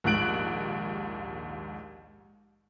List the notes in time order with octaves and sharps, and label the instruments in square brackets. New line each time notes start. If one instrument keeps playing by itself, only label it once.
[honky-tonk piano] A#1 D#2 G#2 F#6 D7 F#7